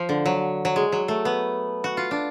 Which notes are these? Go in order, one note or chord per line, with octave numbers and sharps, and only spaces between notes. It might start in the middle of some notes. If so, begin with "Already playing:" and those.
Already playing: F3
D3
F#3
F#3
G#3
F#3
A3
B3
F#4
F4
D4